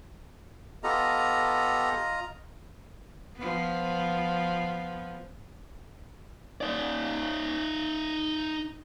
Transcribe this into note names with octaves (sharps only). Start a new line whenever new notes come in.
B3 F4 G4 A4 D#5 A#5
F3 B3
D#4 D5